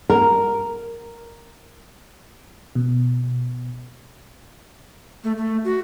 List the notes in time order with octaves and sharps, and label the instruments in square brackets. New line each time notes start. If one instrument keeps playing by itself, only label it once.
[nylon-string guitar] A#4
[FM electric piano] B2
[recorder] A3
A3
F#4